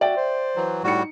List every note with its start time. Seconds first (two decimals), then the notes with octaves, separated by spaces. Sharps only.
0.01 F#4 D5 E5 G5
0.17 C5
0.56 E3 F#3
0.84 A2 G3 D#4 F#4 C#7